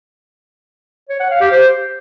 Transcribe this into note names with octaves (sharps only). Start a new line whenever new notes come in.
C#5
F#5
F5
G4
C5